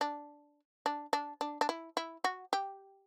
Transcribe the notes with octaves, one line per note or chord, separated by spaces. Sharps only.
D4
D4
D4
D4
D4
E4
E4
F#4
G4